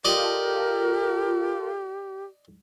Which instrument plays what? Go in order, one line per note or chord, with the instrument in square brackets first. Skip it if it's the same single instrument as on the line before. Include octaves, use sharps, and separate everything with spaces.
[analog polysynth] F4 A4 [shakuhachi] G4 [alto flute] A#4 [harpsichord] D5 D#5